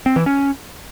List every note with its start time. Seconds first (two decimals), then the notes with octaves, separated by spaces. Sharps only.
0.06 C4
0.16 E3
0.26 C#4